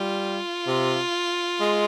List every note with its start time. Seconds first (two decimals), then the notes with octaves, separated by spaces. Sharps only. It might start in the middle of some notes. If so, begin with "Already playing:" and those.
Already playing: G3 F4
0.67 C3
1.60 G#3